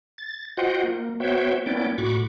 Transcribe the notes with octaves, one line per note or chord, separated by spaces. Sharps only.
A6
F4 F#4 C5 D#5 F#5 G5
A#3
B3 F#4 C5 C#5 E5 G5
A#3 B3 C#4 E4 D5 G5
A2 F#4 B5 C#6 D6